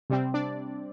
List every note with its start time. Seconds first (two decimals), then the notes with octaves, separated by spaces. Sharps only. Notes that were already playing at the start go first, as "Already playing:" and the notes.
0.10 C3 G3 C4
0.34 D4 D5